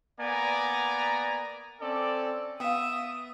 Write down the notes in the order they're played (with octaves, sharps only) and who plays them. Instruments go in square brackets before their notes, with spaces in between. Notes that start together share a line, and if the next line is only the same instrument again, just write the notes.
[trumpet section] A#3 B3 D5 G#5 A#5
C4 C#4 A4 D5
[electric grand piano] B3 [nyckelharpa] E5 [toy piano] F5 G5 [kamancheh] D#6